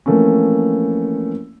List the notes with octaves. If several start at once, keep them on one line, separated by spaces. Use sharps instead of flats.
E3 F3 A3 A#3 C4 C#4